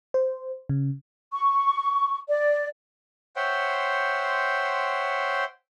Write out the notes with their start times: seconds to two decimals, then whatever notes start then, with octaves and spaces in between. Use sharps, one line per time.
0.14 C5
0.69 C#3
1.32 C#6
2.28 D5
3.36 C5 C#5 E5 F#5 G5 C6